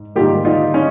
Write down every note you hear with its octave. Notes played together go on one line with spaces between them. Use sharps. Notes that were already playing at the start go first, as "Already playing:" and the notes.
Already playing: G#2
G#2 D#3 G3 A#3 F4 G4
D#4 F4
C#4 D#4